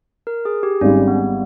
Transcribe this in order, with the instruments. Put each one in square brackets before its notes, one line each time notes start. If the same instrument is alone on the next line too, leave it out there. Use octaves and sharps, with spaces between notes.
[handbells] A#4
G#4
G4
[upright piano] G#1 G#2 G3 [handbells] C#4
[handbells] B3